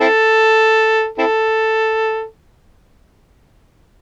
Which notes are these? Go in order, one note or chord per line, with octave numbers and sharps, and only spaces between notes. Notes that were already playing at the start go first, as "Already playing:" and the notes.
C4 E4 A4
C4 E4 A4